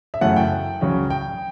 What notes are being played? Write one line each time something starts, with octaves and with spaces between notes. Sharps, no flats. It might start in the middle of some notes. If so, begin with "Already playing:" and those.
E5
F#2 C#3 E3 A3 F#5
G5
C#2 C#3 F#3 C#4
G5